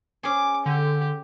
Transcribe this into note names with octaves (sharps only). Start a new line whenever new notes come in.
C#4 G#4 D6
D3 G4